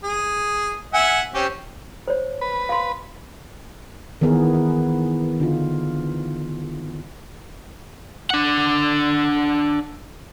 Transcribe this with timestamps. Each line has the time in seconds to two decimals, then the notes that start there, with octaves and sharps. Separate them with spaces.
0.04 G#4
0.94 E5 F#5 G#5
1.34 C4 C#4 G4
2.08 C5 C#5
2.41 B4
2.69 F5 C6
4.21 D#3 E3 B3 G#4 A#4
5.40 D3 D#4 F4
8.30 D4 F#5